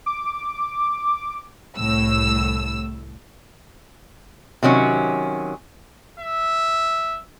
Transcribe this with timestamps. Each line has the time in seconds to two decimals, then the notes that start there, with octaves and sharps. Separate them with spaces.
0.06 D6
1.77 C2 A2 E6
4.63 C3 D#3 F#3 C#4
6.20 E5